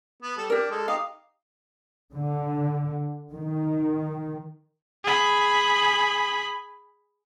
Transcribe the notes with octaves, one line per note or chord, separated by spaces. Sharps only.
B3
G3 A4
D4 G4 A#4
G#3 A4
D#4 G4 D#5 F5
D3
D#3
G#4 B5